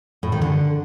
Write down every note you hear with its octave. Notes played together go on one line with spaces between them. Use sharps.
A2
D#3
D3